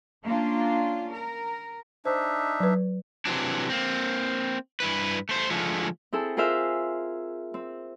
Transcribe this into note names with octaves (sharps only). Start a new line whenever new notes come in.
A#3 C#4 D4 F4
A#4
D4 D#4 C5 E5
F#3 B4
C3 E3 F#3 D4
A#3 C4
G2 E4 B4
A3 C5
D3 F3 G#3 A3
C4 E4 G#4 A4
F4 G#4 A#4 C5 E5 F5
C4